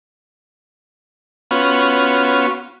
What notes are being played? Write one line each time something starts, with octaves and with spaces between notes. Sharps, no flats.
B3 C#4 F4 F#4